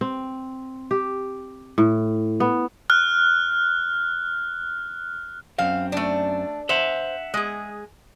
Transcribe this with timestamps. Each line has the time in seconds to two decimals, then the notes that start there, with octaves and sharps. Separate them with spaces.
0.01 C4
0.91 G4
1.78 A2
2.40 B3
2.90 F6 F#6
5.58 F#2 C4 F5
5.92 A3 D4
6.69 C5 E5 F#5
7.34 G#3 G#4